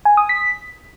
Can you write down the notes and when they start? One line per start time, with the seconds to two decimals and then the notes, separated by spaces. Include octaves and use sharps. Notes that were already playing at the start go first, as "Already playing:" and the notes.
0.05 G#5
0.17 D#6
0.29 B6